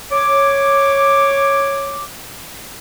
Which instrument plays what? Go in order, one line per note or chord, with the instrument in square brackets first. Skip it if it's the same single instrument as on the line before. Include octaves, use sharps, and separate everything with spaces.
[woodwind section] C#5 D6